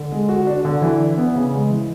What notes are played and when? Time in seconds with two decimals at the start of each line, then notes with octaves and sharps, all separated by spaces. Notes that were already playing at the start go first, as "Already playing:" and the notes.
Already playing: D3
0.12 G#3
0.29 F#4
0.47 D4
0.65 D3
0.82 E3
1.00 D4
1.17 B3
1.35 C#3
1.53 G#3
1.70 E3